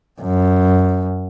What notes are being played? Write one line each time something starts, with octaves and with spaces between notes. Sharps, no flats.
F#2